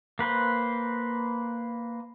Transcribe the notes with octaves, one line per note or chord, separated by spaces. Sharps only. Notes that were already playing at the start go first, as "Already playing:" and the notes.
A#3 B4 C5